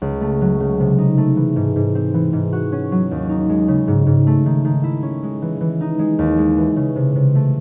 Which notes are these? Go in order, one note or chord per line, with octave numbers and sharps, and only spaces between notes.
C#2
A3
F#3
C#3
C3
D#4
A3
E3
G#2
G#2
C4
E3
G#2
F#4
C#4
F#3
D#2
D#4
G#3
C#3
G#2
G#2
A3
D#3
D#3
E4
C#4
G#3
E3
E3
D#4
G#3
D#2
G#3
E3
C#3
C3
C3
A3